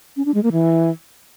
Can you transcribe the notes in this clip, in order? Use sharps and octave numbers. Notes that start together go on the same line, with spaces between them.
C#4
D4
G#3
A#3
E3